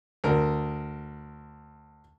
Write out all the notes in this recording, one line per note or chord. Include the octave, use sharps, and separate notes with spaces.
D2 A#4